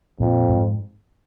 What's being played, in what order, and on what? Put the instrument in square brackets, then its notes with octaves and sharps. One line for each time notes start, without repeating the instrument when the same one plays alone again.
[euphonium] F2 [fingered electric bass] A#2
[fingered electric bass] G#2